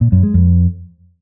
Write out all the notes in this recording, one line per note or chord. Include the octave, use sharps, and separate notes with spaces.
A#2
F#2
G#3
F2